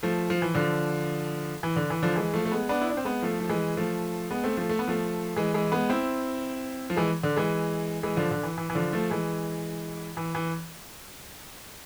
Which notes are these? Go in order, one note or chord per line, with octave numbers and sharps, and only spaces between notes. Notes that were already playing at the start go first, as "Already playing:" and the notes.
F3 A3
F3
E3
D3 F3
E3
D3
E3
D3 F3
E3 G#3
F3 A3
A3
G#3 B3
B3 D4
E4
D4
C4
G#3 B3
F3 A3
F3
E3 G#3
F3 A3
G#3 B3
A3 C4
F3 A3
A3
B3
F3 A3
E3 G#3
E3 G#3
G#3 B3
C4 E4
F3
E3 G#3
D3
E3 G#3
E3 G#3
D3 F3
D3
E3
E3
E3
D3 F3
F3 A3
E3 G#3
E3
E3